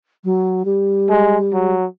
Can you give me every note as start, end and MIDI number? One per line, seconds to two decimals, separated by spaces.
0.24 0.63 54
0.65 1.76 55
1.10 1.37 56
1.53 1.86 54